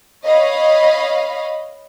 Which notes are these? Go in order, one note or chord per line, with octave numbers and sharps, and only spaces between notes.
C#5 D#5 F5 B5